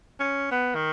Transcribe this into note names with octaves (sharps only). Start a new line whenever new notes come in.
C#4
B3
D#3